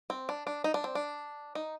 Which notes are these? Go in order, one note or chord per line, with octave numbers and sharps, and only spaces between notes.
C4
D4
D4
D#4
D4
C4
D4
D#4